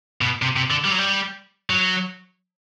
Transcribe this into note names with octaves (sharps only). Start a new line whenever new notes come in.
B2
C3
C3
D3
G3
F#3
G3
F#3